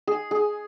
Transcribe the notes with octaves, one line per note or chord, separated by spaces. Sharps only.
G#4
G#4